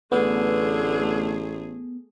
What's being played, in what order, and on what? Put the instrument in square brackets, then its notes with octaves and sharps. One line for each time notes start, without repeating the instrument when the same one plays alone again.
[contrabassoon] A1 [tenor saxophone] D3 [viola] A3 G#4 [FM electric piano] B3